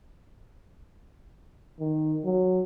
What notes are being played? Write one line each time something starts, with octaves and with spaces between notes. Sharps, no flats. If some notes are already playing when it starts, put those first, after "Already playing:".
D#3
F#3